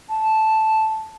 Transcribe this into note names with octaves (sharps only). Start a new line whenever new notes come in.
A5